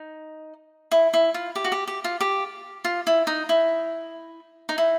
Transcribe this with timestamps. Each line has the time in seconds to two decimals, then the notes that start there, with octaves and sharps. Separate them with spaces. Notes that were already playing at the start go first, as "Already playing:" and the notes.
Already playing: D#4
0.92 E4
1.14 E4
1.34 F4
1.56 G4
1.64 F#4
1.72 G4
1.88 G4
2.04 F4
2.21 G4
2.85 F4
3.07 E4
3.27 D#4
3.49 E4
4.69 D#4
4.78 E4